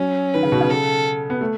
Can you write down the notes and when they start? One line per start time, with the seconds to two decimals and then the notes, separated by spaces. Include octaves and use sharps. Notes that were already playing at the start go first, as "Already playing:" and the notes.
Already playing: F#3 C#4
0.34 D#3 B4
0.43 C#3
0.52 B2
0.61 C#3
0.70 A4
1.30 B3
1.41 A3